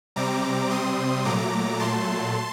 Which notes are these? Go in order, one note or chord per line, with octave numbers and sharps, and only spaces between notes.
C3 G3 C4 A#5 D6
C6 D#6
A#2 F#3 A3 A#5 D6
A5 C6